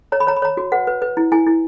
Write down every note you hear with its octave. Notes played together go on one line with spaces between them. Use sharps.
C#5 A#5
B5
C#5 A#5
B5
C#5 A#5
F#4
B4 F#5
B4
B4
E4
E4 G#5
E4